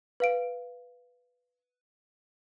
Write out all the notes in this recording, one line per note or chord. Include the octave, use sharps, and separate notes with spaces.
B4 F5 D7